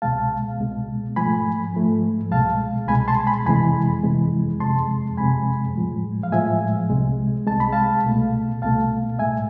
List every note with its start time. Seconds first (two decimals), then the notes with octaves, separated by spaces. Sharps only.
0.02 C2 B2 G#3 F5 A5
0.59 C2 B2 G#3
1.16 G#2 F3 A3 G#5 B5
1.74 G#2 F3 A3
2.31 C2 B2 G#3 F5 A5
2.88 C2 B2 G#3 G#5 B5
3.08 A5 C6
3.27 G#5 B5
3.45 F2 C3 E3 G#3 G#5 B5
4.04 F2 C3 E3 G#3
4.60 F2 C3 G#3 A5 C6
5.17 F2 C3 G#3 G#5 B5
5.75 A2 F3 G#3
6.23 F5
6.32 A2 F3 G#3 E5 G#5
6.90 C2 C3 G#3
7.47 C2 C3 G#3 A5
7.60 B5
7.73 F5 A5
8.05 C2 B2 A3
8.62 C2 B2 A3 F5 A5
9.19 A2 G#3 E5 G#5